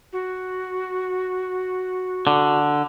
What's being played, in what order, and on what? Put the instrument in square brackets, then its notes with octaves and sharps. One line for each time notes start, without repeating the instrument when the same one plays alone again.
[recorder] F#4
[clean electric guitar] D3